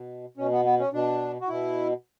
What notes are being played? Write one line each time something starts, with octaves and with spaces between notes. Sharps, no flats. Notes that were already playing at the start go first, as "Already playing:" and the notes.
Already playing: B2
B2 C#4
B3
B3
C#4
B2 D4
F#4
B2 E4